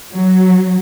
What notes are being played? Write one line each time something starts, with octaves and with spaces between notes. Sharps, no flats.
F#3